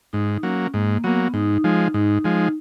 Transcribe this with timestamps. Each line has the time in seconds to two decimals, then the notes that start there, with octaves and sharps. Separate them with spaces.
0.13 G#2 D#4
0.43 F#3 A#3 C#4
0.74 G#2 A#3
1.04 F#3 A#3 B3
1.34 G#2 D#4
1.64 F3 G#3
1.94 G#2 D#4
2.25 F3 G#3